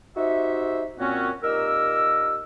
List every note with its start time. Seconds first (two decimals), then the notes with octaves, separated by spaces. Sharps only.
0.16 D#4 F#4 G4 C5 E5
0.98 A#2 C4 C#4 F#4
1.43 A#2 D#4 G4 A#4 E6